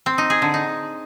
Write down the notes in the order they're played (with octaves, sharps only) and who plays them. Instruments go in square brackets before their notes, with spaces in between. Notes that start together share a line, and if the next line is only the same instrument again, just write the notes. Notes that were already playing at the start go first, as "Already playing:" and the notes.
[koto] C4
D#4
G#4
D3
D#4